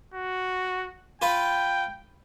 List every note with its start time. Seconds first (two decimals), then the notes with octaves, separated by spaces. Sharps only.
0.14 F#4
1.22 F4 B4 G5 B5